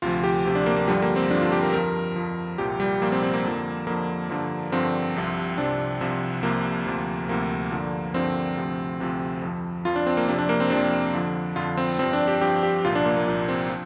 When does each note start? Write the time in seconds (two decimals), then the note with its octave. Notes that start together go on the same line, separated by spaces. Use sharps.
0.02 D2 C3 F3 F4
0.24 G4
0.45 D2 C3 F3
0.55 D4
0.66 A#3
0.76 A#3
0.87 G2 D3 F3 G3
1.02 A#3
1.16 C4
1.30 G2 D3 F3 D4
1.41 F4
1.52 G4
1.62 A#4
1.73 F2 F3 A#4
2.16 F2 F3
2.58 C2 A#2 F3 G4
2.80 G3
3.02 C2 A#2 F3 A#3
3.12 C4
3.23 C4
3.34 A#3
3.44 F2 D3 F3
3.87 F2 D3 F3 A#3
4.29 G2 D3 F3
4.72 G2 D3 F3 C4
5.16 C2 C3 F3
5.58 C2 C3 F3 D4
6.01 C2 C3 F3
6.43 C2 C3 F3 A#3
6.86 D2 C3 F3
7.29 D2 C3 F3 A#3
7.71 G2 D3 F3
8.14 G2 D3 F3 C4
8.57 D2 C3 F3
9.00 D2 C3 F3
9.42 F2 F3
9.85 F2 F3 F4
9.96 D4
10.07 C4
10.17 A#3
10.28 F2 C3 F3 D4
10.39 D4
10.49 A#3
10.60 C4
10.70 F2 C3 F3 D4
11.13 F2 D3 F3
11.56 F2 D3 F3 F4
11.77 C4
11.99 G2 F3 C4
12.13 D4
12.28 G4
12.41 G2 F3 G4
12.63 G4
12.84 C2 A#2 F3 F4
12.95 D4
13.05 A#3
13.16 A#3
13.27 C2 A#2 F3
13.49 C4
13.70 F3